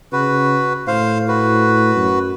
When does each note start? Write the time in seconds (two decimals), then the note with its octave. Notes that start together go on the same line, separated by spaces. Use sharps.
0.13 C#3 F#4 B4
0.87 A2 C5 F5
1.28 F#4 B4
1.95 F#2